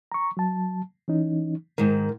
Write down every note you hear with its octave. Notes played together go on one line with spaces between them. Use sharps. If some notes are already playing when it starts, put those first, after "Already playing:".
A#5 C#6
F#3 A5
E3 C#4 D#4
G#2 D#3 A#4